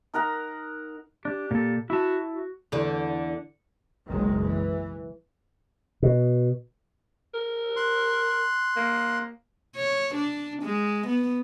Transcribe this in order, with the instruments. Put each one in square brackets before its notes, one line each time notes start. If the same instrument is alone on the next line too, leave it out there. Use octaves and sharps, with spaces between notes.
[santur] D#4 A#4 F#5 A#5
[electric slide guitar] D4 [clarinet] G4
[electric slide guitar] A#2 A4
[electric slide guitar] E4 A5 [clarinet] F#4
[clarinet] F#4
[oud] E2 D3
[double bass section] F#1 B1 D#3 G#3
E3
[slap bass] B2
[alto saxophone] A#4
[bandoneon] C6 F#6
[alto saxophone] A#3
[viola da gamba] C#5
D4
G#3
B3